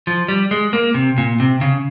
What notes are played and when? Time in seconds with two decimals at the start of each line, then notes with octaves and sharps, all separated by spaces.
0.07 F3
0.28 G3
0.51 G#3
0.73 A#3
0.94 C3
1.18 A#2
1.40 C3
1.61 C#3